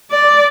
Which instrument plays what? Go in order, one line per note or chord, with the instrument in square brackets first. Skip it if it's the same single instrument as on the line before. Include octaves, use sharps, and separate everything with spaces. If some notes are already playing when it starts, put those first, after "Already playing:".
[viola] D5